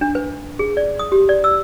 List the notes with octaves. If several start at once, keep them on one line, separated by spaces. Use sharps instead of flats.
D4
B4
G#4
D5
D#6
G4
D5
E6